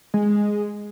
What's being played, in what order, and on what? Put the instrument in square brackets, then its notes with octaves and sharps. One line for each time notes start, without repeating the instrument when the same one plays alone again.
[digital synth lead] G#3